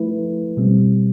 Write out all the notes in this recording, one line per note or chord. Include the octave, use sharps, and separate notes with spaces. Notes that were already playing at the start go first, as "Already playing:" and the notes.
Already playing: F3 A3 E4 B4
B2 G3 C4